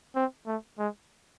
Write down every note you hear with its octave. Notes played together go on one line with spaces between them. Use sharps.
C4
A3
G#3